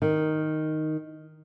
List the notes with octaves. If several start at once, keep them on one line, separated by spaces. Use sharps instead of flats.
D#3